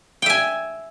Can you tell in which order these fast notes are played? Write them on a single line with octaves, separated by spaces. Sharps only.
G5 E5 G#5